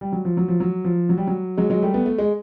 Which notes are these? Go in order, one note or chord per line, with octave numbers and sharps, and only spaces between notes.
G3
F#3
F3
F#3
F3
F#3
F3
F#3
G3
F#3
F#3 G#3
F#3 G#3
G3 A3
A3 B3
A3
G#3